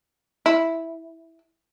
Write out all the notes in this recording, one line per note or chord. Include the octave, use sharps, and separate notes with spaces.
E4